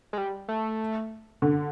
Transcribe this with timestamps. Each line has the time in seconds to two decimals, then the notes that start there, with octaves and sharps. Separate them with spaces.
0.13 G#3
0.18 G3
0.48 A3
1.42 D3